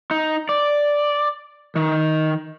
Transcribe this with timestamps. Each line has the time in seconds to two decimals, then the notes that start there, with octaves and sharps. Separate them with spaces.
0.11 D#4
0.49 D5
1.76 D#3